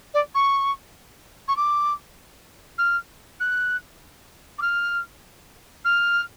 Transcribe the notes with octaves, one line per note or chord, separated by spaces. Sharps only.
D5
C#6
C#6
D6
F6
F#6
D6
F6
F6